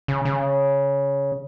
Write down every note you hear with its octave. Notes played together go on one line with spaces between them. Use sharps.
C#3
C#3